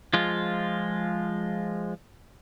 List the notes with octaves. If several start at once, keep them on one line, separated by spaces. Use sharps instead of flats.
F3 G#3 F4